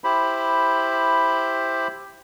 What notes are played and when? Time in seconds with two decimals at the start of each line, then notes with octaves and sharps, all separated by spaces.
0.04 E4 G4 C5 B5